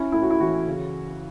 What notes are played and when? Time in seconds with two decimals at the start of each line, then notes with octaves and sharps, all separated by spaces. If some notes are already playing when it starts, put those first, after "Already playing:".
Already playing: C#4 E4
0.12 A2 E4
0.22 F#4
0.30 E4
0.40 E3 F#4
0.67 C#3